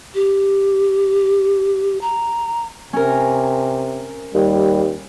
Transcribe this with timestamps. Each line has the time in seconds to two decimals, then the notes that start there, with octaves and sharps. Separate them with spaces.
0.15 G4
2.01 A#5
2.93 C3 C#4 A#4
4.34 D#2 G3